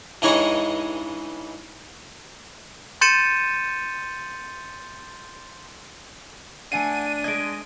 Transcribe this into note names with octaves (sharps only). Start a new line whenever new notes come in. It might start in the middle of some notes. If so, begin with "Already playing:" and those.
G2 E3 G#3 D#4 C#5 D#5
C6 G6 A6 C#7 D#7 E7
A3 D4 F#5 G#5 C7 D#7
G#3 D#5 G#6 D7